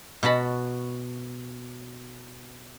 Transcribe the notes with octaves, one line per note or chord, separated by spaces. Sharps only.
B2 F#4 A5 B5